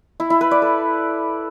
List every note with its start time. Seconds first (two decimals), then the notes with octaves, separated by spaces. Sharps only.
0.20 E4
0.30 E4
0.41 B4
0.51 D5
0.62 A4